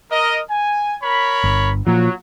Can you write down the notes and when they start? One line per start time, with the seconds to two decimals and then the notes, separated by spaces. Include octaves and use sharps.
0.11 A#4 D#5
0.51 G#5
1.03 A#4 C#5 B5
1.44 G1
1.87 A#2 F3 F#3